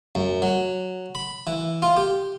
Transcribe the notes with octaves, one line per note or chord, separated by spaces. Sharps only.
F#2
F#3
B5
E3
F4
G4